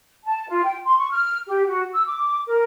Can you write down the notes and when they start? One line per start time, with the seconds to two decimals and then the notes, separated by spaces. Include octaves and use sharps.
0.24 A5
0.49 F4
0.63 G5
0.85 C6
0.98 C#6
1.12 F6
1.47 G4
1.67 F#4
1.93 E6
2.06 D6
2.47 A#4